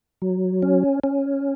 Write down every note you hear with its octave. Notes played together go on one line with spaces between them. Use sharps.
F#3
C#4
C#4